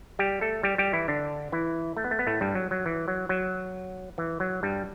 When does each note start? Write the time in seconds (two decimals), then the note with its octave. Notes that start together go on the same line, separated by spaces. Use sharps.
0.19 G3 G4
0.41 A3 A4
0.63 G3 G4
0.78 G3 G4
0.93 E3 E4
1.08 D3 D4
1.52 E3 E4
1.97 A3
2.04 B3
2.11 A3
2.19 B3
2.27 A2 A3
2.41 G2 G3
2.55 F#3
2.71 F#3
2.86 E3
3.08 F#3
3.29 F#3
4.18 E3
4.40 F#3
4.63 G2 G3